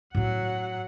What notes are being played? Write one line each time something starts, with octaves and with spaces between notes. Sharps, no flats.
A2 F#3 C#4 F#5